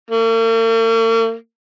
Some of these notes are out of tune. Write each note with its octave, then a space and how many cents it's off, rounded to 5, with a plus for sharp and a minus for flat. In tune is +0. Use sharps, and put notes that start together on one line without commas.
A#3 -45